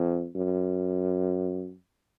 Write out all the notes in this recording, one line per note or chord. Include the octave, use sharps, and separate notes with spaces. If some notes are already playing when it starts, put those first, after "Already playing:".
Already playing: F2
F#2